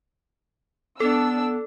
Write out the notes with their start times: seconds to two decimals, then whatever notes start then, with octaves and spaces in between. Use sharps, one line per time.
1.00 B3 D4 A4 E6